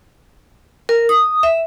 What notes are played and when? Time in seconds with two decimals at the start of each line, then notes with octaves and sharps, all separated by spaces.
0.89 A#4
1.09 D#6
1.43 E5